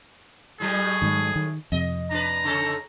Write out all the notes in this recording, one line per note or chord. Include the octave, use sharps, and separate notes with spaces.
A2 F#3 G3 G#4
G#2 D#3
D#3
F2 C3 D#5
D4 B4 A#5
C#3 C#4 A4